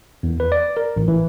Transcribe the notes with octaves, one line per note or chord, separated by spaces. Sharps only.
E2
B4
D5
A#4
A1
E3